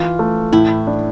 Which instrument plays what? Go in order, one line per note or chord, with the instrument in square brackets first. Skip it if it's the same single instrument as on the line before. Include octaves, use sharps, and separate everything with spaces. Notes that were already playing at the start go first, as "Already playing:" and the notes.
Already playing: [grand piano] E3 [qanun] F4
[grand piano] A3
[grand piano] A2 [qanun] E4
[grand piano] D4